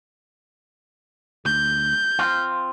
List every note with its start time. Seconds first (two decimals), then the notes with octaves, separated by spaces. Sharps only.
1.45 D2 G6
2.19 C4 F4